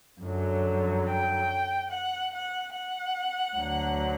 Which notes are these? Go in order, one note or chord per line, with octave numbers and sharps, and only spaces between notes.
F#2 D3 F#3
G5
F#5
F#5
F#5
D2 D3 F#3